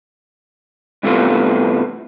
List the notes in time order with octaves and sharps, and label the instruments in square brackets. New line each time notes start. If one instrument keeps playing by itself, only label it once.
[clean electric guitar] G2 C3 E3 A3 B3 F4